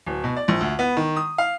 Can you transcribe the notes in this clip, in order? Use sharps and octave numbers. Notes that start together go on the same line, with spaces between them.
D1
B2
D5
A#1
D2
B3
D#3
D#6
F5